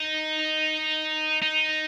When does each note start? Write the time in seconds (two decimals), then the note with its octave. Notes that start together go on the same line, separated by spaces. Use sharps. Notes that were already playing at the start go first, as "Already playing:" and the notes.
Already playing: D#4
1.42 D#4